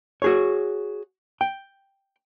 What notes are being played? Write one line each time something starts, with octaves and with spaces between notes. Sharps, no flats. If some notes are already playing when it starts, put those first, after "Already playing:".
F#4 G#4 C#5
G5